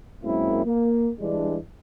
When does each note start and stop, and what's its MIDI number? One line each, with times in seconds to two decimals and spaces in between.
0.24 0.65 42
0.24 0.65 56
0.24 0.65 58
0.24 0.65 60
0.24 0.65 64
0.66 1.10 58
1.20 1.57 52
1.20 1.57 55
1.20 1.57 56
1.20 1.57 62